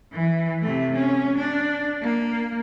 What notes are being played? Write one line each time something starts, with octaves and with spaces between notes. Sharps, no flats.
E3
C3 A3
C#4
D4
A#3